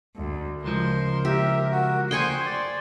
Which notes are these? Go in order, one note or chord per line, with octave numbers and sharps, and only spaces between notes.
D2
C#2 F3 A#4 C6
G4 E5
F#4
C5 G5 G#5 C6 C#6 D#6 G6
D5